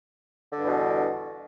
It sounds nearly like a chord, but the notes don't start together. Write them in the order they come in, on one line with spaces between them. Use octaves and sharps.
D3 G2 E2 B2